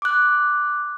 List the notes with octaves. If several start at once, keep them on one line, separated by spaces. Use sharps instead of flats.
D6 F#6